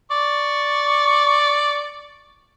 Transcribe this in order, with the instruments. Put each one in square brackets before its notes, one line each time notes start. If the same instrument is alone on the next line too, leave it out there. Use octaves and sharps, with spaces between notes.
[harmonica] D5 C#6